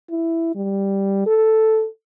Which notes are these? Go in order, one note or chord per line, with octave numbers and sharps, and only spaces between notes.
E4
G3
A4